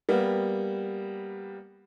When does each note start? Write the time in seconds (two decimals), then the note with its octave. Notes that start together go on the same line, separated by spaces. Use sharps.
0.09 G3 A#3 B3